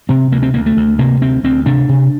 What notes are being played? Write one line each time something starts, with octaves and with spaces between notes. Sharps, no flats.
C3 C4
D2 A#3
C4
D2 A#3
A3
D2
C3 A#3
D2 C4
D2 C4
C3 D4
C3